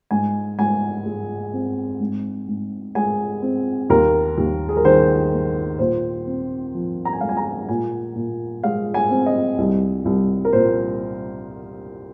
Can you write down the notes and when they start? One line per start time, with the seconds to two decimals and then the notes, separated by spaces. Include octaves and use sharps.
0.11 G#2 G#5
0.58 G#2 G#5
1.05 G#3
1.53 C4
2.00 G#2
2.48 G#2
2.95 G#3 G#5
3.42 C4
3.90 D#2 A#4
4.38 D#2
4.69 G#4
4.77 A#4
4.85 D#3 C5
5.32 A#3
5.79 A#2 C5
6.27 C4
6.74 F3
7.05 A#5
7.13 G#5
7.21 G#3 F5
7.29 G#5
7.37 A#5
7.69 A#2 G#5
8.16 A#2
8.63 G#3 F5
8.94 G#5
9.10 C4
9.26 D#5
9.58 C2
10.05 C2
10.45 A#4
10.53 A#2 C5